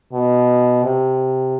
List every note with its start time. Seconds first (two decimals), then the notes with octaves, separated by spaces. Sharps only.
0.13 B2
0.83 C3